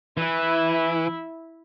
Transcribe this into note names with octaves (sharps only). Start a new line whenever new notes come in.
E3 E4 E5